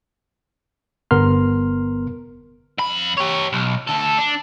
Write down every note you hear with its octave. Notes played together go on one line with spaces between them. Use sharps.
G1 B3 A#4 C6 F6
F2 B5
G4 C#5
B1
D2 A4
D4